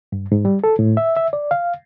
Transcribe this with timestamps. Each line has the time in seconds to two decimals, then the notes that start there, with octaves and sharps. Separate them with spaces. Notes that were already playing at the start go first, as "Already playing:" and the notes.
0.12 G2
0.32 G#2
0.45 G3
0.64 A4
0.79 A2
0.97 E5
1.17 E5
1.33 D5
1.51 F5